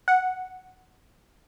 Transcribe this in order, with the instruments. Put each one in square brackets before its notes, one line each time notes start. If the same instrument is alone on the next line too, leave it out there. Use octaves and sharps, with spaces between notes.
[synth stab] F#5